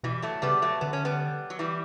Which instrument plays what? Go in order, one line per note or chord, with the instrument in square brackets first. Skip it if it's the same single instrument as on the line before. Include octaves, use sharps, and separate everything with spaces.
[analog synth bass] B2 [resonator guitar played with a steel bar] E3 G3
[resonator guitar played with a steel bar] F#3 A3
[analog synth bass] C#3 [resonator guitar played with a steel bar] G3 B3
[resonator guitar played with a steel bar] F#3 A3
[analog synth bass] D3 [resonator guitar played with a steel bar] B3
[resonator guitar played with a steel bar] C#4
G3 B3
F#3
E3 G3